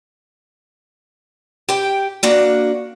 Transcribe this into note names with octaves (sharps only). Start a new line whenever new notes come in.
G4 G5
A#3 D4 F#4